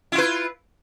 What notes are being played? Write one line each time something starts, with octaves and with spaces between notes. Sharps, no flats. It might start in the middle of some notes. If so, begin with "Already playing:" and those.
E4 F4 B4